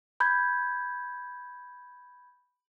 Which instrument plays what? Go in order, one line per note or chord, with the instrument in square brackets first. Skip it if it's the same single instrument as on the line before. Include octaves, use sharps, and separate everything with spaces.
[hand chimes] B5 G6 G#6